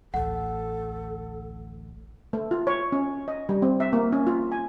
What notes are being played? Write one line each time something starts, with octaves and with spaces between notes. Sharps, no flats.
A1 D2 A4 F#5
A3
F4
C#5
C#4
D#5
G3
C4
E5
A#3
C#4
F4
G#5